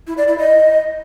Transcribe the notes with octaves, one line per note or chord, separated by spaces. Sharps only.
E4
D5
E4
D#5